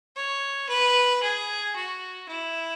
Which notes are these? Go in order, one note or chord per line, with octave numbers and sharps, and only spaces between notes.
C#5
B4
G#4
F#4
E4